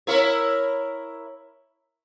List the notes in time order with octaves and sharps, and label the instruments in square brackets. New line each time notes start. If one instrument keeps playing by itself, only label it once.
[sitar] E4 A#4 C#5